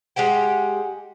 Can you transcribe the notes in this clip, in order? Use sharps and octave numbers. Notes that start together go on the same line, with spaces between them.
G#3 G4 F#5 G5